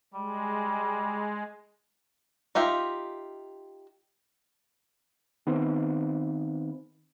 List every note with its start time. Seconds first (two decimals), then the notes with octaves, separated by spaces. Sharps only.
0.14 G3 G#3
2.55 D#4 F4 G4 E5
5.47 D#3 B3 C4